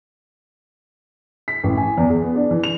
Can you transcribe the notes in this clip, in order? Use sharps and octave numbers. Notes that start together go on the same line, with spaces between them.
B6
A1
G#5
E2
G#4
B3
D4
E3
F7